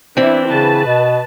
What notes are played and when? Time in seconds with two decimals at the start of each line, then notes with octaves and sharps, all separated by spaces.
0.17 E3 C4 D4 E4
0.49 C#3 B4 A5
0.86 B2